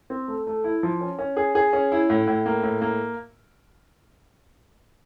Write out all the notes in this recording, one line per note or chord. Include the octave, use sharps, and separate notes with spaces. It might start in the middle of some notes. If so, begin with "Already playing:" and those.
C4
A3
A3
E4
F3
C#4
C#4
G#4
G#4
C#4
E4
A2
A2
A#3
A2
A#3